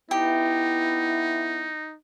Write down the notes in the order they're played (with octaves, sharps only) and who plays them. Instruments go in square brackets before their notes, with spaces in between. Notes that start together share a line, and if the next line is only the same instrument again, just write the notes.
[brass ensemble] B3 E4 [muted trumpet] D#4 [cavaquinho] G4